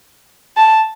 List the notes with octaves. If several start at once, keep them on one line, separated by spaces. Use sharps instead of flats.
A5